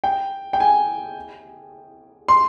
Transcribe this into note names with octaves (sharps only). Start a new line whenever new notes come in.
G5
G5
G#5
C6